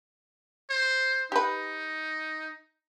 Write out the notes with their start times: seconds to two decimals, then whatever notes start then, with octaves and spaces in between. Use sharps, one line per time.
0.71 C5
1.32 D#4 G4 B4